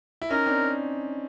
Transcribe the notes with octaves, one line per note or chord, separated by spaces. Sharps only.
E4
C#4 D#4 A#4
C4 D4